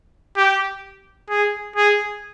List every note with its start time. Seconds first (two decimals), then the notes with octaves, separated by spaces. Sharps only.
0.37 G4
1.30 G#4
1.76 G#4